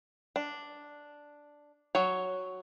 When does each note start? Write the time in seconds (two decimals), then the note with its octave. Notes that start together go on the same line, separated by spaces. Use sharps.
0.36 D4
1.95 F#3 C#5